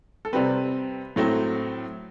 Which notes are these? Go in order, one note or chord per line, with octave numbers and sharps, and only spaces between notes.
A4
C3 G3 C4 B4
A2 F#3 A3 C4